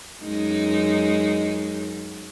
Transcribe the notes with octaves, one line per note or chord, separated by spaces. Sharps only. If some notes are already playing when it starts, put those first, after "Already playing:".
F#2 G#3 D#4